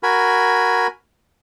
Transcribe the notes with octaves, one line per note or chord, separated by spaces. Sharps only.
F#4 A#4 G#5 B5